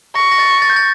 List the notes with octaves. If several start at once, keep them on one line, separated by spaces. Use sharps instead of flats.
C#6 A#6
A#6
A6
A6
G6
A6